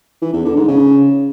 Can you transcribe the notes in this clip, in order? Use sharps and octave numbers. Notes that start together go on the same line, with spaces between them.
E3
E2
D3
G#2
C#3